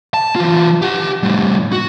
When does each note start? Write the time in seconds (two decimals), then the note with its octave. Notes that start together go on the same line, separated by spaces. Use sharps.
0.14 A5
0.36 E3 F4
0.82 G4 F#5
1.23 A2 G3
1.72 F#4